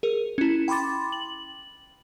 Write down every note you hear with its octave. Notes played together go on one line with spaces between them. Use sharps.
G#4 A#4
C#4 E4
G5 B5 C6 D6 A6
F#7